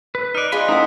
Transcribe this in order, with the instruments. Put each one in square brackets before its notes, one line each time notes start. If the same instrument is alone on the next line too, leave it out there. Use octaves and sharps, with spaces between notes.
[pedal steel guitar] B4
[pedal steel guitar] D#4 D5 [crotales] F6 F#6
[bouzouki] G#3 F4 [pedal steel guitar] B5
[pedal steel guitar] A3 E4 [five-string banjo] D#4 F#5 [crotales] D#6